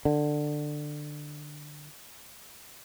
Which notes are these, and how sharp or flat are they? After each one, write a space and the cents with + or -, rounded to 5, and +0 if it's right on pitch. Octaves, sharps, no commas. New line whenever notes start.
D3 +15